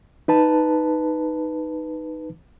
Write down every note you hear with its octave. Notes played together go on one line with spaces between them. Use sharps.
D#4 B4 A5